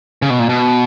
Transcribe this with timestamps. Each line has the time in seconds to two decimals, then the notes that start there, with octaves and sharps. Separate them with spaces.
0.22 C#3
0.30 B2
0.39 A#2
0.49 B2